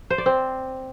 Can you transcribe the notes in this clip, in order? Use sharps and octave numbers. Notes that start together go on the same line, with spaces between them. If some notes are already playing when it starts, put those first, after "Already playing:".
C5
D5
C4